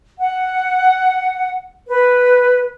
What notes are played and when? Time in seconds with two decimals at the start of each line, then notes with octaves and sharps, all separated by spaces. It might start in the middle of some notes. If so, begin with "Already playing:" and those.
0.18 F#5
1.86 B4